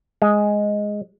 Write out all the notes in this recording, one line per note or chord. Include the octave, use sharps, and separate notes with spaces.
G#3